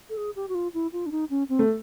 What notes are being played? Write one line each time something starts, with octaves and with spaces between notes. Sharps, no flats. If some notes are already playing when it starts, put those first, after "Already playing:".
A4
G#4
G4
F#4
F4
E4
F4
D4
D#4
C#4
C4
A3